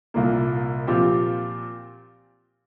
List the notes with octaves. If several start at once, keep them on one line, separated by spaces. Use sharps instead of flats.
C2 A#2 A#3
A#2 F3 C4 G4